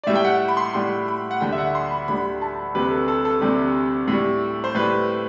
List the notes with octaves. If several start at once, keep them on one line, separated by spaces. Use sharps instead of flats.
D5
A2 G3 E5
G5
F#5
B5
C6
A2 G3 C6
B5
F#5
D2 D3 G3 G5
E5
F#5
C6
B5
D2 D3 G3 B5
A5
D2 C3 G3 B4
A4
A4
A4
D2 C3 G3
A2 G3
C5
A2 G3 B4